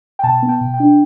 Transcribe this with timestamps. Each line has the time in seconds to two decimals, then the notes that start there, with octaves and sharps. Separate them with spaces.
0.19 G5
0.23 B2 A5
0.42 B3
0.49 G5
0.61 B2
0.74 G5
0.80 D4